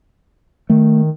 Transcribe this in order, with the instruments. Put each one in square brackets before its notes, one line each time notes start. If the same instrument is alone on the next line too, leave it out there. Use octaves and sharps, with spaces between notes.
[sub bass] D#3 [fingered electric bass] A3